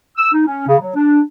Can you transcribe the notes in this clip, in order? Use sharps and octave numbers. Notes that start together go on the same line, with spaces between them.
E6
D#4
C#4
C#3
F#3
D4